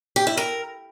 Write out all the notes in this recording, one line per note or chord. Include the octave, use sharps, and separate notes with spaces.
G4
E4
A#4